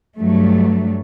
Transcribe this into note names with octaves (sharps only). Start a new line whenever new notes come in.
G2 F#3 A3